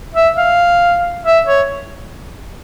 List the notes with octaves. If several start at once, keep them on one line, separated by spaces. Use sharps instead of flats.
E5
F5
E5
C#5